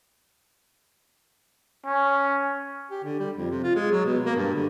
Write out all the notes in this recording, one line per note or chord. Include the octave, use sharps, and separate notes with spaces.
C#4
G4
D3
G3
F2
C3
F4
G#3
F#3
B2
A#3
G2
D3